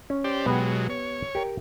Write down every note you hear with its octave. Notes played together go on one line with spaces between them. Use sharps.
C#4
G4 C5 D5
B2 F#3 G#3 B3 G4
C#5
G4 A#4